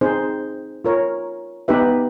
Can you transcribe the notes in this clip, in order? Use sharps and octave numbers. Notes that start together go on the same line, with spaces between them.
C4 D#4 G#4 C5
F4 A#4 C#5
B3 D#4 G4 B4 E5